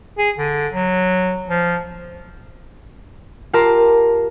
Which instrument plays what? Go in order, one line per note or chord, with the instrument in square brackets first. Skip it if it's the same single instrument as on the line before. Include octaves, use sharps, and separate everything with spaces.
[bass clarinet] G#4
D3
F#3
F3
[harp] F4 G4 A#4 A5 A#5 C6